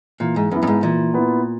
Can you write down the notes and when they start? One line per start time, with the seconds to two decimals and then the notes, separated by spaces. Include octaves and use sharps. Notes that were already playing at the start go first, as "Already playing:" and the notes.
0.20 A#2 E3
0.36 G#2
0.51 F#2 B3
0.55 E4
0.63 F#2
0.67 G#2
0.83 A#2 E3
1.14 B3 E4